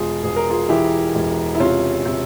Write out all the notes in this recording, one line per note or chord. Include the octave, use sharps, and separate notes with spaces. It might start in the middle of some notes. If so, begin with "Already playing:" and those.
Already playing: E1 F4 G#4
E1 G#4
A#4
F4 G#4
E3 E4 G4
E1
E4
C3 C#4 F4
C3